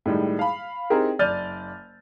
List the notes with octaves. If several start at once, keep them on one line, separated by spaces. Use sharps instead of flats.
A2 D#3 G3 G#3
F5 B5
C4 D#4 E4 G4 G#4 A#4
F#1 D5 F6 G6 A6 D#7